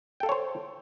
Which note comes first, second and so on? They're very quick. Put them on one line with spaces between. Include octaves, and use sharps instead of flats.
G5 A4 F5 C#5 C5